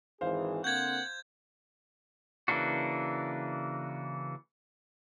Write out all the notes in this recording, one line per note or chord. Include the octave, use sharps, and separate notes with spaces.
G#1 E3 G#4 C5 F5
D3 A#3 C4 F#5 G6 G#6
C#3 E3 A#3 D4 F#4